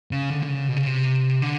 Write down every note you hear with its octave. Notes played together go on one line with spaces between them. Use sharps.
C#3
D3
D3
C#3
B2
C#3
C3
D3